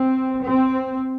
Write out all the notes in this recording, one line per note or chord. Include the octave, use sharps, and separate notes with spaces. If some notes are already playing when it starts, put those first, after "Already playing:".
Already playing: C4
C4